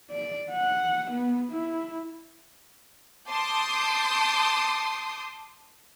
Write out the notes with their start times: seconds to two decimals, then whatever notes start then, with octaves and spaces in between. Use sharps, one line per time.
0.11 D5
0.51 F#5
1.12 B3
1.52 E4
3.28 A5 C6 D6 D#6 G6